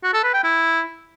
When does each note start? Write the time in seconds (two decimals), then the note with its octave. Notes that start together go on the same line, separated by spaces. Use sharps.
0.04 F#4
0.14 A4
0.24 B4
0.34 G5
0.44 E4